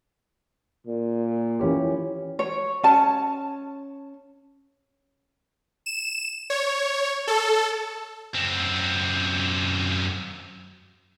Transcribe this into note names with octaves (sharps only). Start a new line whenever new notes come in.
A#2
E3 C#4 G4
C#5
C#4 A5
E7
C#5
A4
F#2 C4